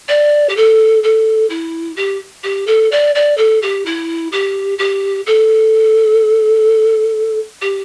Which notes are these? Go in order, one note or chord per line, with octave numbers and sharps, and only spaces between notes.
D5
G4
A4
A4
E4
G4
G4
A4
D5
D5
A4
G4
E4
G4
G4
A4
G4